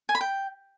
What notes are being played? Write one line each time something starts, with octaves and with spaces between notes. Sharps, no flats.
G#5
B5
G5